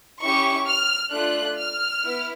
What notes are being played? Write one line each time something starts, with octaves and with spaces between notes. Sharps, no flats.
C#4 E4 G4 C#6
F6
A3 D4 F4 F#6
F6
B3 E4